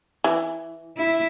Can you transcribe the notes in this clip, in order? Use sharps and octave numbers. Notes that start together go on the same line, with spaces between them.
E3
E4